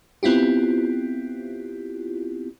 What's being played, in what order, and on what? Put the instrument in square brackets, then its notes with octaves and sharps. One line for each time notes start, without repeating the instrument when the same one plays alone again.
[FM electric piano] B3 C4 E4 F4 G4